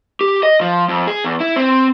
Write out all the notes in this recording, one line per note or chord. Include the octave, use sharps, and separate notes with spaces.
G4
D#5
F3
F2
G#4
E2
E4
C4